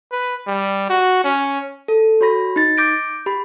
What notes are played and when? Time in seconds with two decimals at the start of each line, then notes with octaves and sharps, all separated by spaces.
0.12 B4
0.47 G3
0.90 F#4
1.24 C#4
1.88 A4
2.21 F#4 C#5 B5 A#6
2.56 D#4 A6
2.77 D6 G6 A#6 D7
3.26 G4 B5